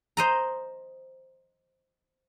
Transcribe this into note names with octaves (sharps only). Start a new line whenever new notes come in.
C5 D#5 A#5